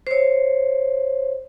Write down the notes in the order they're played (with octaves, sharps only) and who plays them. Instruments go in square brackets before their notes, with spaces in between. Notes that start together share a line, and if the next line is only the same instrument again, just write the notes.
[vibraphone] C5 C#5